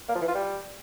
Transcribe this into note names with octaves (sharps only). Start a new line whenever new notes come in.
A#3
F3
E3
F4
G3